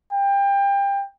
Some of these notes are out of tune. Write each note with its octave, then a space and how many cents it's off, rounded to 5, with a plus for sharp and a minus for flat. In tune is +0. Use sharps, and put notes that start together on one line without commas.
G5 +25